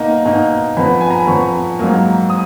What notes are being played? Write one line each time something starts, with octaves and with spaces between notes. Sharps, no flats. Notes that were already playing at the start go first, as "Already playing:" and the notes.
Already playing: B2 A#3 D#4
B2 A#3 D#4
F2 F3 B3 B5
G#5
A#5
B5
F2 F3 B3 C#6
G#2 F#3 A#3
D#6